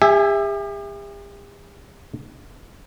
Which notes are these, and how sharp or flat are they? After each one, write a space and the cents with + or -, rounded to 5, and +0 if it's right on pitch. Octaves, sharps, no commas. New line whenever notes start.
G4 +45 E5 +0 G#5 +0